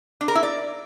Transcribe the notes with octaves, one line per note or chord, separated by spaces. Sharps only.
D4
A#4
E4
D5